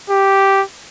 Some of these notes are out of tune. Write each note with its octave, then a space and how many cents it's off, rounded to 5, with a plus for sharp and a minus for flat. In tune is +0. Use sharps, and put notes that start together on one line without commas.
G4 -5